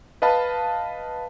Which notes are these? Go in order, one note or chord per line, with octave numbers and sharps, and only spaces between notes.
B4 D#5 F5 A5 B5